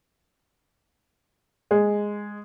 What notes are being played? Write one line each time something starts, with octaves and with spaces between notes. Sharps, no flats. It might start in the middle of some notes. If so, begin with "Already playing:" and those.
G#3